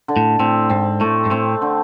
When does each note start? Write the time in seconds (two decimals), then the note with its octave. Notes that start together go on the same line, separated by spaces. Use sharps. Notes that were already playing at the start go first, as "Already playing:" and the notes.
0.08 D3
0.16 A2
0.39 A2 C4
0.70 G#2 C4
1.00 A2 A3
1.25 G#2
1.30 A2 C4
1.62 D3